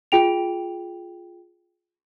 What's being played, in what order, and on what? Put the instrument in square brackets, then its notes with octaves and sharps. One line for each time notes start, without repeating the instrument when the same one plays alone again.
[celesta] F4 G#4 G5 D7 F7